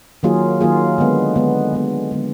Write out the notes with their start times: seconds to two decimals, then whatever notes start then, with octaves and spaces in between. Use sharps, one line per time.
0.23 D#3 F#3 A#3 F4 G#4
0.61 D#3 F#3 A#3 F4 G#4
0.98 D3 G#3 B3
1.36 D3 G#3 B3
1.73 D3 G#3 B3
2.11 D3 G#3 B3